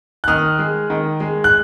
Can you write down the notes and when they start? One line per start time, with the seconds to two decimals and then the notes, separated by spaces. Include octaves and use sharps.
0.24 F#6
0.27 D#3 D#6 F6
0.59 G#3
0.90 D#3
1.20 G#3
1.44 F#6